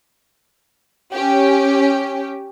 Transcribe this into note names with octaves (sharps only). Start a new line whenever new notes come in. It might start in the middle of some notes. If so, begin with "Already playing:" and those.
C#4 G4